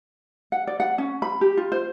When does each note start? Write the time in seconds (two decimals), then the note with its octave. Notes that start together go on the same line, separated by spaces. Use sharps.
0.52 F#5
0.67 D5
0.80 F#5
0.98 C#4
1.22 B5
1.41 G4
1.57 F4
1.72 C5